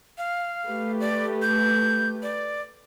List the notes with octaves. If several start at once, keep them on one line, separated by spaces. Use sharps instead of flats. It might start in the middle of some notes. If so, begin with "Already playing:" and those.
F5
A3 G4 B4
D5
G6
D5